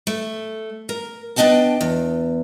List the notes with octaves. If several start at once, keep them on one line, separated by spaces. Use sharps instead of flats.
A3
A#4
B3 D4 D#4 D#5 G5 A5
E2